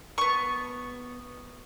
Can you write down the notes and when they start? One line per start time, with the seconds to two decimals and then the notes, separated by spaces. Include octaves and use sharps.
0.18 B3 C#6